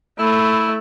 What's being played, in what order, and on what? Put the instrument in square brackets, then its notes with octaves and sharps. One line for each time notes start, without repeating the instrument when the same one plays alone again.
[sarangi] A3 [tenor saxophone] E4 [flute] B5